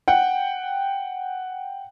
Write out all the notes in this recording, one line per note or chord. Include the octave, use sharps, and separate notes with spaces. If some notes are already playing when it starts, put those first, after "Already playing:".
F#5 G5